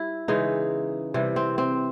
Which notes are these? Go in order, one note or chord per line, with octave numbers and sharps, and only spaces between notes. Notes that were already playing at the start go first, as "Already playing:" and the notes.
Already playing: G3 E4
C#3 E3 G#3 D#4
C3 E3 G3
C4
C4